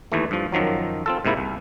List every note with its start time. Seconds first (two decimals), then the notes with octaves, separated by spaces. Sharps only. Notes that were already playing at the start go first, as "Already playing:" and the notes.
0.12 D#2 E3 A3
0.31 G2 F3
0.52 F#2 D#3 F3 F#3
1.06 C4 F4 A4
1.25 G#2 C3 A#3 E4
1.37 C2